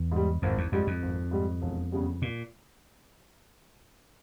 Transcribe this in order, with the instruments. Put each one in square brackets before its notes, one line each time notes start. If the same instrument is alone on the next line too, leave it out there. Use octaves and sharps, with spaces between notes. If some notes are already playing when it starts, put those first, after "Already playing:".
Already playing: [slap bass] E2
[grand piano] G#2 G3
[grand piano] G#1 [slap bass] F2
[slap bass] E2
[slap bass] F2 [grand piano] G#2 G3
[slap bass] F2
[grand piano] G#1
G#2 G3
E1
E2 C#3 G3
[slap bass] A#2